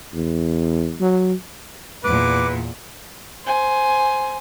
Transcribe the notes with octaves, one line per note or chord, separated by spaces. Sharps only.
E2
F#3
E2 A#2 B4 D6
C5 G#5